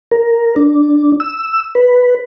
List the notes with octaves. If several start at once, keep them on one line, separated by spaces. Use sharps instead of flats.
A#4
D4
E6
B4